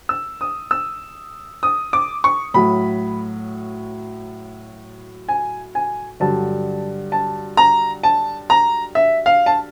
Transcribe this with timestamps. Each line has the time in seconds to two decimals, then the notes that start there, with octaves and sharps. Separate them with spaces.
0.09 E6
0.41 D#6
0.71 E6
1.63 D#6
1.93 D6
2.24 C#6
2.54 A2 F#3 B5
5.29 G#5
5.75 G#5
6.20 G2 D3 F#3 A5
7.12 A5
7.57 A#5
8.03 A5
8.50 A#5
8.95 E5
9.26 F5
9.46 A5